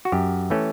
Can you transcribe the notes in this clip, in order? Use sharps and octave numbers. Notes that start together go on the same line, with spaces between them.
F#4
F#2 G4
E3 A3 C#4